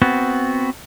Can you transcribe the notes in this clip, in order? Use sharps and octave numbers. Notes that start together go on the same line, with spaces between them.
B3 C4 F#4